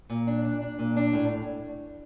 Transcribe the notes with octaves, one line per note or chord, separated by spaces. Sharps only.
A#2
D4
D4
D4
A#2
D4
A2